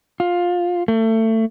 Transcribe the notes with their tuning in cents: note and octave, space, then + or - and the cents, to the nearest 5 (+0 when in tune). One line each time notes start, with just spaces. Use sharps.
F4 +15
A3 +25